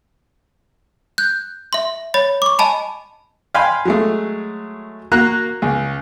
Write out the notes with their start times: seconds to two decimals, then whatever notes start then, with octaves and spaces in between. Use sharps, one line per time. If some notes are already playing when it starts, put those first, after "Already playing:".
1.18 F#6 G6
1.73 E5 C6
2.14 C#5 B5 A6
2.42 C#6 D6
2.59 D#5 G#5 A5 B5
3.54 F5 G5 G#5 B5 C6
3.85 F#3 G#3 A3
5.12 A#3 F#4 A#5 F#6
5.62 C#2